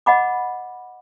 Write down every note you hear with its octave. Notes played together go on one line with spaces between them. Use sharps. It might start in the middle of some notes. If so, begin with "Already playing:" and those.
D#5 F#5 B5 D6